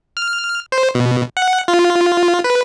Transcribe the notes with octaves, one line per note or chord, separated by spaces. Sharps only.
F6
C5
B2
F#5
F4
B4